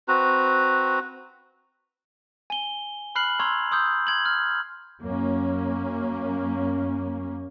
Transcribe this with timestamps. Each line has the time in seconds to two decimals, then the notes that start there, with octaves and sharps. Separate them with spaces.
0.08 C4 F#4 B4 A#5
2.50 G#5 G7
3.15 B5 F6 F#6 C7 F#7
3.40 A#5 C6 C#6 E6 G#6
3.71 C6 D#6 E6 G6
4.07 C6 G#6 F#7
4.25 F6
5.02 F#2 A#3 C#4